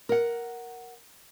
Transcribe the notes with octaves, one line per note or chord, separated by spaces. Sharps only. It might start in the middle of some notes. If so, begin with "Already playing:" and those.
A#4 F#5